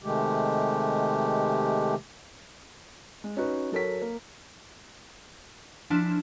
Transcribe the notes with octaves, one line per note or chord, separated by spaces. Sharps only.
C3 D#3 G#3 A3 G4
G#3
C#4 D#4 F#4 B4
F#3 A4 A#4 C#5 B6
A#3
F3 D4 E4